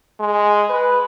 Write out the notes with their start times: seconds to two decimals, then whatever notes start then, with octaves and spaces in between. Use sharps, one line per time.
0.20 G#3
0.70 B4